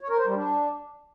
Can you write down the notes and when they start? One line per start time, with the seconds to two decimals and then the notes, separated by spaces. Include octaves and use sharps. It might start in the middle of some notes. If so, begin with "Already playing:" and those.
0.01 C#5
0.10 A#4
0.18 C5
0.27 G3
0.35 D4